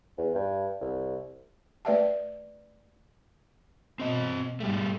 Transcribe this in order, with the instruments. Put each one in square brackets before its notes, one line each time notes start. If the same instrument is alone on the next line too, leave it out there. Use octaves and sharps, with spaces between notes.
[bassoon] E2
G2
C2
[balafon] A3 B4 D5 E5 F#5 A5
[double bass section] B2 [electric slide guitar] C4 D#5
[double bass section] G#2 [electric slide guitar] G3 A3